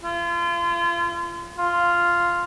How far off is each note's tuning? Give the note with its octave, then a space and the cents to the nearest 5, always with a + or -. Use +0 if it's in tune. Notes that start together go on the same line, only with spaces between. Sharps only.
F4 -35
F4 -5